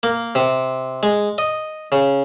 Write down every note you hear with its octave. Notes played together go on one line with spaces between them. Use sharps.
A#3
C3
G#3
D#5
C#3